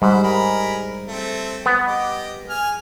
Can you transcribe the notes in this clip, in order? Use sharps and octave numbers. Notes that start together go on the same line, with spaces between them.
G#2 G3 C5 F#5 B5
G#4 A#4 B5
A3 C4
B3
G4 D#5 D6
G#4 G#5 F6